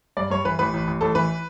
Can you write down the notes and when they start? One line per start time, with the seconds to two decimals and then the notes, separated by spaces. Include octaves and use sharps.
0.17 G2 D5
0.30 G2 C#5
0.45 E3 B4
0.59 A1 B4
0.74 A1
0.88 A1
1.01 A1 A4
1.15 E3 B4